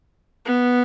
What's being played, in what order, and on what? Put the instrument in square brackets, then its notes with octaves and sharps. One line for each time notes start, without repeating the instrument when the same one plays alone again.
[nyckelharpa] B3